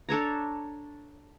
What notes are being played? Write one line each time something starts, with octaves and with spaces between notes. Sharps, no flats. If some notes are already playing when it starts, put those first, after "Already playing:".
D4 A4 C#5 A#5